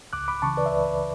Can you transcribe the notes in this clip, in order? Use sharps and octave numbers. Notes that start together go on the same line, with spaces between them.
C#2 D6 F#6
B5 D6
C#3 E3 A5 C#6
B4 D5
E5
C#2 B4 D5